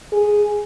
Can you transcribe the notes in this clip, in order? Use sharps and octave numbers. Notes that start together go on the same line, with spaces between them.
G#4